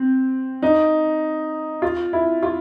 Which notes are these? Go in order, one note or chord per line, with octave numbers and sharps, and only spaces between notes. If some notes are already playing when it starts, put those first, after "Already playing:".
Already playing: C4
D#4
F4
E4
F4